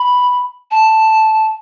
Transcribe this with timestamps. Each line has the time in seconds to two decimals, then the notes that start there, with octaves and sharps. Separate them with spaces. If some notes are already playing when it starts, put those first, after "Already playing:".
Already playing: B5
0.71 A5